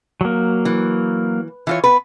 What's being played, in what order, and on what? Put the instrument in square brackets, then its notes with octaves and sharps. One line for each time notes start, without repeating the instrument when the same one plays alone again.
[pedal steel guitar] F#3 A#3
[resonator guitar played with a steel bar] E3
E3 F4 C#5
B3 B4